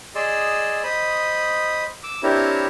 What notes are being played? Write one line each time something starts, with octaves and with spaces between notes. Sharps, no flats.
G#4 D5 D#5 C6 E6
C5 D#5 B5 D#6
D6 E6
C4 D4 E4 G4 A#4 C#5